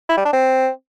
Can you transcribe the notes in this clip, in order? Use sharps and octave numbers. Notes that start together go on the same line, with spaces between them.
E4
G3
D4
C4